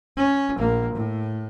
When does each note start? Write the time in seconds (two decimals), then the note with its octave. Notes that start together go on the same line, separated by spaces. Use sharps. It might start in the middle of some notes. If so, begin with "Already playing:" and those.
0.17 C#4
0.57 A#1 A#3
0.94 A2